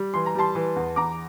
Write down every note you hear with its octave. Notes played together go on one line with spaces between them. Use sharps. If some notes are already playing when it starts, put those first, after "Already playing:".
Already playing: G3
E3 C6
A#5
G3 A5 C6
E3
E2
E2 A#5 D6